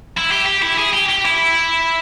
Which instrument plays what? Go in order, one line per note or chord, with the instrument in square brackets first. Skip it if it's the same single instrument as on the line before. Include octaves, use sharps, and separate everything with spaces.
[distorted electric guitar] E4
G4
G4
E4
G#4
G4
G4
E4